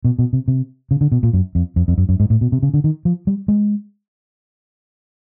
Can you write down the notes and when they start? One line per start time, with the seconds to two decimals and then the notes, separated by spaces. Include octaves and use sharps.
0.04 B2
0.19 B2
0.33 C3
0.48 C3
0.91 C#3
1.01 D3
1.12 B2
1.23 A#2
1.33 F#2
1.55 F2
1.76 F2
1.88 F2
1.98 F#2
2.09 F#2
2.20 G#2
2.30 A2
2.41 B2
2.52 C3
2.63 C#3
2.74 D3
2.84 D#3
3.05 F3
3.27 G3
3.48 G#3